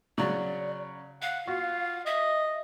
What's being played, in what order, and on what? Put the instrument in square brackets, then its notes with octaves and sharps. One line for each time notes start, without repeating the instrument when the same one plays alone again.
[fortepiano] C#3 F#3 [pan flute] D5
[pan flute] F5 [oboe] F#5
[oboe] F4 [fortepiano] F#4
[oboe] D#5 [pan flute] E5